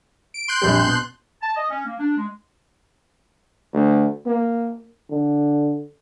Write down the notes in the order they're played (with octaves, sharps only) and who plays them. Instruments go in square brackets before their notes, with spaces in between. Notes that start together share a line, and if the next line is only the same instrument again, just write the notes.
[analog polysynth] D7
C6 F#6 G6
[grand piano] A#1 F2 G3
B2
[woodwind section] A5
D#5
C#4
A#3
D4
G#3
[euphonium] D2
A#3
D3